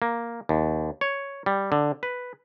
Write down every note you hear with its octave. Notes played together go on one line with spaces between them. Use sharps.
A#3
D#2
C#5
G3
D3
B4